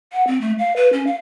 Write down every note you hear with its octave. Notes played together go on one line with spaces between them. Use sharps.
F#5
C4
A3
F5
B4
C#4
F5